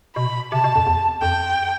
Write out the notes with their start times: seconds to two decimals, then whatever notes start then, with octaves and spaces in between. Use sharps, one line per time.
0.16 B2 B5
0.52 C3 A5
0.64 B2
0.76 F2
0.87 E2
1.22 F2 G5